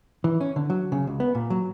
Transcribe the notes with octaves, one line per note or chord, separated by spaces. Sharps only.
E3
C#4
D3
F#3
C#3
C#2
B3
A#2
F#3